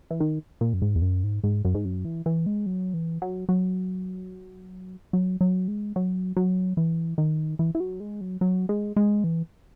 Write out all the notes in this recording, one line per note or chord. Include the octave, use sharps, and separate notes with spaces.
E3
D#3
A#2
F#2
G#2
E2
F#2
G#2
G#2
F#2
G#2
F#2
E3
E3
G#3
F#3
E3
F#3
F#3
F#3
F#3
G#3
F#3
F#3
E3
D#3
E3
E3
F#3
G#3
F#3
F#3
G#3
G#3
E3